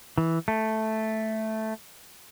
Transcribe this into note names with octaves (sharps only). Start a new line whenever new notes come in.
E3
A3